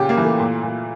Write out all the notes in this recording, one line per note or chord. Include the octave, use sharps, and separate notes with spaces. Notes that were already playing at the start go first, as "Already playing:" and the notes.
Already playing: A#2 C#3 G4
A#3
E3
A3
A#2
A#2